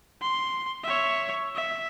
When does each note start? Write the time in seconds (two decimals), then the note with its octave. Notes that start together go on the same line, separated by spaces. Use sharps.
0.21 C6
0.83 C#5 E5
1.55 E5